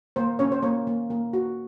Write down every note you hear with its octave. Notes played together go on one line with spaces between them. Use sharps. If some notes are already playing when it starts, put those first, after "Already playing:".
A#3 C5
C#4 C#5
C5
A#3 C#5
A#3
A#3
F#4